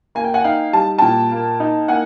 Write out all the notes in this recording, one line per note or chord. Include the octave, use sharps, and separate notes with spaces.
A#3 G#5
G5
F#5 G#5
D#4 F5 G5
G3 A5
A#2 G5 A5
A#3
D#4
A#3 F#5 G#5